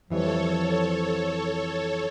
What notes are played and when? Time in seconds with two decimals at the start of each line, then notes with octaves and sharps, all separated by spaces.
0.10 F2 E3 F3 G3 A4 C#5